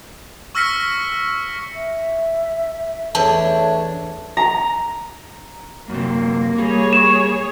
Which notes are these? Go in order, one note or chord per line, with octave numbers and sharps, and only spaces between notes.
C#6 E6 F6 A#6 B6 C#7
E5
E2 A3 D4 C#5 A5
A#5
F#2 C3 A#3
G3 G#4 C#5
C#6 E7